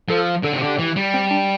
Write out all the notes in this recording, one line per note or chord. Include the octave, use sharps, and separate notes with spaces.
F3 A4
D3 A4
C3
D3 G4
E3
G3
C4
D4